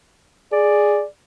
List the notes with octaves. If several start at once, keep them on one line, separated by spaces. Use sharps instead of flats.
G#4 D5